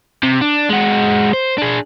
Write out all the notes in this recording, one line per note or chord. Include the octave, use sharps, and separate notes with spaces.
C3
D4
G#3 F#4
C5
D4 G#4